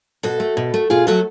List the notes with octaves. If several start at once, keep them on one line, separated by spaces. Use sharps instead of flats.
B2 F#4 A4
A3
B2
A3
B2 F4 G#4
F#3 A3 F#4 A4